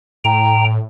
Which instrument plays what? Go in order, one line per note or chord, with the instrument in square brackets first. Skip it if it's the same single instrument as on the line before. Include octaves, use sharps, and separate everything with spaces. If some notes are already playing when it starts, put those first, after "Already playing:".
[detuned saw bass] A2 [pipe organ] G5 A#5